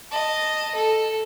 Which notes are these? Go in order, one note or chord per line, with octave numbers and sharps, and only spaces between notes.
D#5 A5
A4